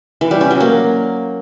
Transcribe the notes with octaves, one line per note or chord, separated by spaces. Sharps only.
E3
G3
C#4
F#3
A#3